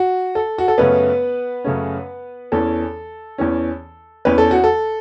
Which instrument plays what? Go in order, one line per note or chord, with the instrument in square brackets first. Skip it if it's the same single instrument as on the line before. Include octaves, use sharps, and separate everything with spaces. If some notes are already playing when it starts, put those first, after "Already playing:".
Already playing: [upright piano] F#4
A4
F#4
A4
F#2 C#3 A3 B3 C#4 B4
F#2 C#3 A3 C#4
E2 E3 C#4 A4
E2 E3 C#4
E2 E3 C#4 B4
A4
F#4
A4